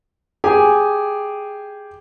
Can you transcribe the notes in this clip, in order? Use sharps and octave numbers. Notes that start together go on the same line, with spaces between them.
G4 G#4 G#5